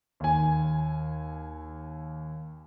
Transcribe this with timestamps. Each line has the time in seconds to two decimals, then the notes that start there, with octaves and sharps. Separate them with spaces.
0.20 D#2 G#5